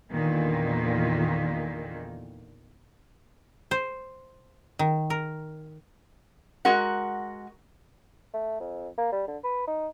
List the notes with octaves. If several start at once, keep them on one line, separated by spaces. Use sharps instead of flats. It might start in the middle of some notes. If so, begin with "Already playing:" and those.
E2 A#2 D3 D#3
C5
D#3
A#4
G#3 F#4 A#4 F#5
A3
F2
A#3
G3
D3
B4
D#4